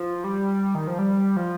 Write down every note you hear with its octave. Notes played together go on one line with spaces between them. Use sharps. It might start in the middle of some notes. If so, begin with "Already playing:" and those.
Already playing: F3
G3
D#3
F3
G3
F3